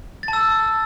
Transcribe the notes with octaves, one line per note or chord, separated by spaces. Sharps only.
A6
A5
E6